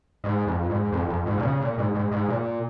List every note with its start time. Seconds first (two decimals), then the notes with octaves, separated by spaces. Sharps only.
0.24 G#2
0.47 F2
0.70 G#2
0.92 F2
1.09 F2
1.26 G#2
1.38 A#2
1.43 C#3
1.61 A#2
1.78 G#2
1.94 G#2
2.11 G#2
2.28 A#2